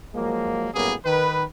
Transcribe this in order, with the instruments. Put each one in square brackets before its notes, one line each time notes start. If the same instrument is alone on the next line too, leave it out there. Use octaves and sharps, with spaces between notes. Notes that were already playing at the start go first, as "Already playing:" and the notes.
[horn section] F3 F#3 G#3 A#3
F#2 A2 G3 A#3 B3 G#4
D#3 B4